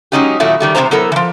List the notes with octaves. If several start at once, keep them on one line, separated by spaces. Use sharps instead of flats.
F#3 G#3 C#4 D#4 F4 G4
A#2 D#3 F#3 A3 E4
D#3 G3 A3
E2 C3 G3 B3 C5 A#5
F#3 B3 E4 A4 A#4
E3 F3